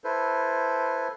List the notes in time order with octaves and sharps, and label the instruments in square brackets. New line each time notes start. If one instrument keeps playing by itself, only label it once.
[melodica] E4 A4 B4 C5